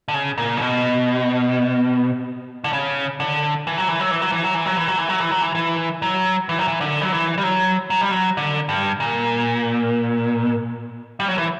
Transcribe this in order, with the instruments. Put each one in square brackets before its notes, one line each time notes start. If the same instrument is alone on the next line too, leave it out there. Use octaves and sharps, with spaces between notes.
[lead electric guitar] D3
C#3
A#2
C#3
B2
D3
C#3
D3
E3
F#3
E3
F#3
E3
F#3
E3
F#3
E3
F#3
E3
F#3
E3
F#3
E3
F#3
E3
E3
F#3
E3
F#3
E3
D3
F#3
E3
G3
F#3
F#3
G3
F#3
D3
G2
A#2
G3
F#3
E3